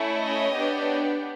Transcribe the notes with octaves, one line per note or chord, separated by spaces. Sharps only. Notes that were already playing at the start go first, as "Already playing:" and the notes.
Already playing: A3 C#4 E4
C#5 D#5
B3 D4 G4